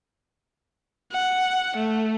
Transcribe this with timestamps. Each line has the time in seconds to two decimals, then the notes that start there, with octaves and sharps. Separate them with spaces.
1.12 F#5
1.77 A3